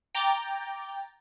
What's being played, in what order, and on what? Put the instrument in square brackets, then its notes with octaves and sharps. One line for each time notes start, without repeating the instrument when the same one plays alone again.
[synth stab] G5 A#5 D6 G6 A6